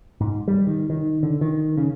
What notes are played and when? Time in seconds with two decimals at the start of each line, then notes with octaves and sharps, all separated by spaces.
0.21 G#2
0.48 G3
0.67 D#3
0.90 D#3
1.23 D3
1.41 D#3
1.78 C#3